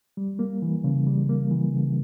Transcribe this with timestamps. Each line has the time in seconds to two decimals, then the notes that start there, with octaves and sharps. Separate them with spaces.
0.17 G3
0.39 A#3
0.62 E3
0.84 C#3
1.07 G3
1.29 A#3
1.51 E3
1.74 C#3